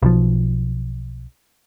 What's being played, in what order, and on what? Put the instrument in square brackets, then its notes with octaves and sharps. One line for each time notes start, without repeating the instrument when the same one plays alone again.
[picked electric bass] B1 F3